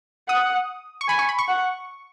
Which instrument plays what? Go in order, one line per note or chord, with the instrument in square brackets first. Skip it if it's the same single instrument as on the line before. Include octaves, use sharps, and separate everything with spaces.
[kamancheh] F#5 [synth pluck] D#6
[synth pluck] C#6
[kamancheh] G#5 [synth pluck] B5
[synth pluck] C#6
B5
C#6
[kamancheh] F#5